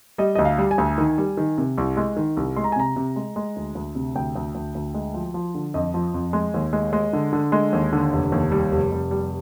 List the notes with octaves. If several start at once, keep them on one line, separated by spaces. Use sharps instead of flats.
G3 D#5
D2 D#5
F5
G3
G#5
D2
D#3
G3
D#3
C3
C2
G#3
D#3
C2
G#3 C6
A#5
G#5
C3 A#5
C3
G#3
G#3
D2
D2
C3
D2 G5
D2
D2
D2
G#3
F3
F3
D3
F2 D#5
F3
F2
G#3
D#2
G#3
G#3
D3
D3
G#3
D#2
D3
F1
D#2
G3
F1
F1
G3